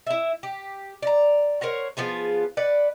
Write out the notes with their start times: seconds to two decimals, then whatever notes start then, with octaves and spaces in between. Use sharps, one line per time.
0.07 E4 E5
0.43 G4
1.02 D5 A#5
1.61 A#4 C5 C#5 F#5
1.97 F3 B3 F4 G#4
2.57 B4 D5 F#5